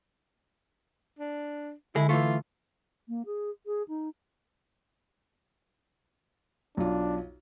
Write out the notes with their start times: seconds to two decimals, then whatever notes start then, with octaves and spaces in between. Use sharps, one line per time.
1.19 D4
1.96 D3 G#3 E4
2.09 E3 A3 F4
3.08 A#3
3.26 G#4
3.66 G#4
3.88 D#4
6.77 B1 D4 F4